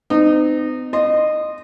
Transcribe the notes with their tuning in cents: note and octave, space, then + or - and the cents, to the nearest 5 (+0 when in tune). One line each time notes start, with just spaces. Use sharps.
C4 -45 D#4 -25
D#5 -20 C6 +0